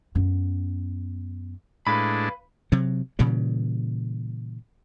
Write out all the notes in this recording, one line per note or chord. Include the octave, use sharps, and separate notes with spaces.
F#2 B3
A2 G#3 D4 B4 F5 B5
C3 F#3
A#2 C#3 E3 G3